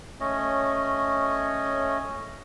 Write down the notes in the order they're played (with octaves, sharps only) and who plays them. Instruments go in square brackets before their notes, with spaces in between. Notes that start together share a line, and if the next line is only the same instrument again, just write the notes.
[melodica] A3 C#4 C#5 D#5